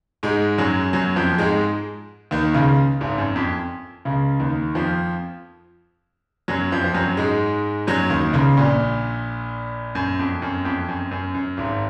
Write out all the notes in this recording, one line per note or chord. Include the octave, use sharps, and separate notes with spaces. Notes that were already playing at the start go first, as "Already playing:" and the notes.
G#2 G#3
F#2 F#3
F#2 F#3
F2 F3
G#2 G#3
D#2 D#3
C#2 C#3
G#1 G#2
F#2
F2
C#2 C#3
D#2 D#3
F2 F3
F#2 F#3
F2 F3
F3
F#2 F#3
G#2 G#3
F#2 F#3
D#2 D#3
C#2 C#3
A#1 A#2
F#2
F2
F#2
F2
F#2
F#2
F#2
G#1 G#2